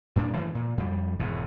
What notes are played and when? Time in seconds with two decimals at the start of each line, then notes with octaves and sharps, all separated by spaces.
0.16 G2 A#2 D4
0.34 C#3 E3 F#3 A3
0.55 A#2
0.78 F2 G3
1.19 E1 E2 G#2 B2